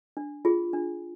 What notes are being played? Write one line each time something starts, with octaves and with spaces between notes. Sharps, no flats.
D4
F4 G#4
D4